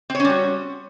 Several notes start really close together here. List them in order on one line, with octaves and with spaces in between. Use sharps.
C4 C#5 C#4 G3 F#4